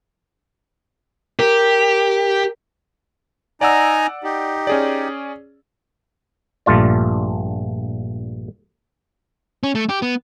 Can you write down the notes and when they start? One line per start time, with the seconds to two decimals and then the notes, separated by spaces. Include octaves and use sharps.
1.39 G4 A#4
3.61 D#4 D5 F#5 G#5 A#5 E6
4.24 D#4 G4
4.67 C#4 G#4 D5
6.66 A#1 G2 A3 F4 D5
9.63 C#4
9.75 A3
9.89 G4
10.02 B3